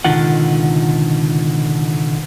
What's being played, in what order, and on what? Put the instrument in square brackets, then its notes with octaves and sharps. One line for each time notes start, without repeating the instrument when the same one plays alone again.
[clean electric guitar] C#2 B2 D3 D#3 F4 F#5